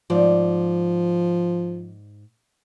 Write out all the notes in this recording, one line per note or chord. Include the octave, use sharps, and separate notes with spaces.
G#2 F3 D5